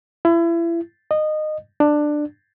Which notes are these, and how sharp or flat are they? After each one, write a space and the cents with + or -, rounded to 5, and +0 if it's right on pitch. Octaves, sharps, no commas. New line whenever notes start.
E4 +30
D#5 -20
D4 +15